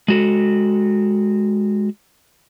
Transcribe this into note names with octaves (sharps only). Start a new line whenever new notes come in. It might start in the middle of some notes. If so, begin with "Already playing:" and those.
G#3 F#4 A4